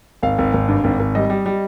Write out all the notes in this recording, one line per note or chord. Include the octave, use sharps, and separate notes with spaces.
G#1 F5
G#1
G#1
G2
G#1
G#1
G3 D#5
G3
G3